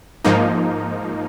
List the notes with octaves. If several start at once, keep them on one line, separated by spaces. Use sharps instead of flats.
G#2 F3 A#3 D#4